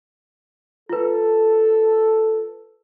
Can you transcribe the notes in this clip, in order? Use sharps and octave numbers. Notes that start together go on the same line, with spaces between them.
F4 A4 B4